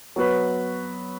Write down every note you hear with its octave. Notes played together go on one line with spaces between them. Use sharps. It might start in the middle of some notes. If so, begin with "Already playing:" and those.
F#3 B3 F#4 B4